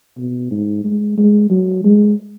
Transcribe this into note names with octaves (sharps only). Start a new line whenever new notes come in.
B2
G#2
G#3
G#3
F#3
G#3